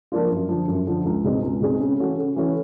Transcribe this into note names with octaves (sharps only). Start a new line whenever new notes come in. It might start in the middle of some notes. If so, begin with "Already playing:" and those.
F3 A#3 D4 F4
F#2
D3 F3
F#2
D3 F3
C#2
B2 G#3 C4 D#4
C#2
B2 G#3 C4 D#4
C#3
E3 A3 C#4 F#4
C#3
E3 A3 C#4 F#4